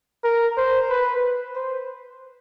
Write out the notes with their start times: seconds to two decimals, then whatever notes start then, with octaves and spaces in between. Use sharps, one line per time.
0.24 A#4
0.57 C5
0.90 B4
1.55 C5